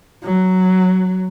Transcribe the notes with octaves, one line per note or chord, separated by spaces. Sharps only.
F#3